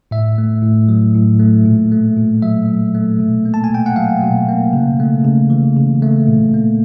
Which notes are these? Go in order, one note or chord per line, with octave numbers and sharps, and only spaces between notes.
A2 E5
A3
A2
F#3
A2
A3
A#2
A3
A#2
F#3 E5
A#2
A3
B2
A#3
A5
G#5
B2 G5
F#5
F#3 F5
B2
A#3
C#3
A3
C#3
E3
C#3
A3
A#2
A#3